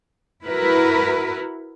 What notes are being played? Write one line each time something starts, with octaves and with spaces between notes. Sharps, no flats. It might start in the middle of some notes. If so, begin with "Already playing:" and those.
E4 F#4 A#4 B4